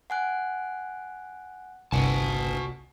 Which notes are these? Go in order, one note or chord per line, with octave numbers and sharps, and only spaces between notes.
F#5 G#5 F#6
G1 C2 F#4 F#5 G#5 A5